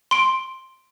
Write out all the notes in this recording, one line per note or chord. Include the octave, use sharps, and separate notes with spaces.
C6 D7